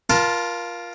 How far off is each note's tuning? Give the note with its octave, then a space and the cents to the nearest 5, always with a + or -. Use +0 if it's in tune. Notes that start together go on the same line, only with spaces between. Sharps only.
F4 +0 A#4 +30 A5 +0